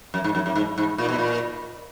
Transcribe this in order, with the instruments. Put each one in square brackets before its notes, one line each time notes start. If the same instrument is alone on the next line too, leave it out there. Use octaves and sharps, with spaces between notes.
[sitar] F#2
G#2
F#2
F#2
G#2
G#2
A#2
B2
A#2